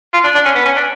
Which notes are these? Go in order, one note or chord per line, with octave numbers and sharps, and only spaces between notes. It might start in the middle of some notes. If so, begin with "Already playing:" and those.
F4
D4
D4
C#4
B3
C#4
D4